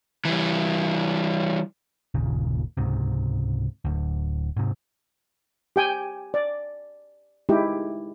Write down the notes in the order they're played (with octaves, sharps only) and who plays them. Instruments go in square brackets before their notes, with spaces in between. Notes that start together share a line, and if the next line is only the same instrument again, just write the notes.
[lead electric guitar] E3 G3
[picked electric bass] G1 D#2 A#2 C#3
C#2 G#2 C3
D1 D2
G#2 C3
[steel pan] G4 G5 G#5
D5
G#3 D#4 E4 G4